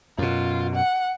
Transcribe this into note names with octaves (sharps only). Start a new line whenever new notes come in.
F#2 B2 F4
F#5